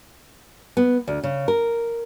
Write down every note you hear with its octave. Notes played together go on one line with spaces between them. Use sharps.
B3
D2
C#3
A#4